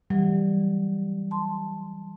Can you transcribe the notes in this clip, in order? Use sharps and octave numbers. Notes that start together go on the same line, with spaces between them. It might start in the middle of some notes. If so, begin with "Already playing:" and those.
E3 F#3 G3
A5 C6